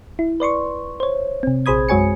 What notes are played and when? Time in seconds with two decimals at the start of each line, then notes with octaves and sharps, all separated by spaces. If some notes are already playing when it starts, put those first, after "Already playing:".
0.19 E4
0.40 B4 D5 C6 C#6
1.00 C5 C#5
1.43 C3 C4
1.66 A#1 G#4 C5 B5 D#6 G#6
1.89 F#2 G#3 F#4 C#5 G#5 C#7